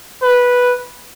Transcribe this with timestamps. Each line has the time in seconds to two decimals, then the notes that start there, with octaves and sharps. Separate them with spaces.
0.22 B4